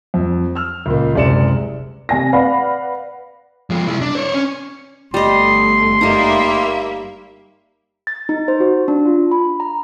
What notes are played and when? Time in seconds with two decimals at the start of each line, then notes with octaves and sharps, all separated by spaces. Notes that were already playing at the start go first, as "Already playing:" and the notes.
0.14 F2
0.55 E6 F6
0.86 C#2 A#2 A#3
1.15 F#1 C2 G#3 D5 C#7 E7
2.09 C3 G#5 A#6
2.33 B4 D5 F5 F#5 B5
3.70 F3 G#3
3.87 C2 E4
4.01 D4
4.15 C5 C#5
4.34 C#4
5.14 G1 G3 A3 D#5 C6
6.01 G3 A#3 D#4 E5
8.07 A6
8.29 D#4
8.48 C5
8.60 F#4
8.88 D4
9.06 F4
9.31 B5
9.60 A#5